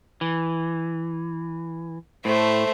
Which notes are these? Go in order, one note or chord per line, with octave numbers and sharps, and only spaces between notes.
E3
A2 A3 C5